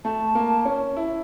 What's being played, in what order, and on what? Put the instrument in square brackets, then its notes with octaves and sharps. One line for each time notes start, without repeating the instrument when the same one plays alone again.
[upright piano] A3 [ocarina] A5
[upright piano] A#3
C#4
E4